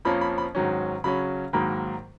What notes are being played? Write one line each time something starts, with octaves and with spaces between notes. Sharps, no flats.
F2 F3 A#3 C#4 B5
B5
B5
G#2 D#3 F#3 C#4
C#3 F#3 C#4 B5
G#2 D#3 F#3 A#3 B5